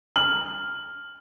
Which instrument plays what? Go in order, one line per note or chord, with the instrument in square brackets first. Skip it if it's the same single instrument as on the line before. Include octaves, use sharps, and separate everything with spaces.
[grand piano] F6 F#7